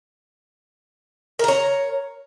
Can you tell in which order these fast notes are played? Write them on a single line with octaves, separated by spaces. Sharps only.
A#4 A#5 C#5